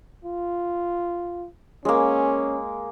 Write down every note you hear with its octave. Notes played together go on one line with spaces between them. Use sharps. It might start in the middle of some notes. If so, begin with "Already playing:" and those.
F4
G#3 A#3 C#4